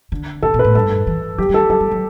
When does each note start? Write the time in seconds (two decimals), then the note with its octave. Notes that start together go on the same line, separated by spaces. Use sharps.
0.12 D3
0.42 C3 A4
0.54 B2
0.59 B4
0.64 A2
0.75 G2 A4
1.07 E3
1.38 F#3 G4
1.49 G3
1.54 A4
1.70 F#3 A4
1.80 G3
1.91 F#3